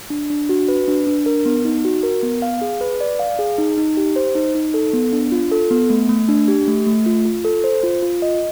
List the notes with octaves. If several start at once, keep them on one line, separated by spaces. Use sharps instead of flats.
D4
D4
F#4
B4
D4
D4
A#4
B3
D#4
F#4
A#4
B3
F5
G#4
B4
D5
F5
G#4
D#4
D#4
G4
C5
D#4
D#4
A4
B3
D4
F4
A4
B3
A3
A3
D4
G4
A3
A3
F4
F4
A4
C5
F4
F4
D#5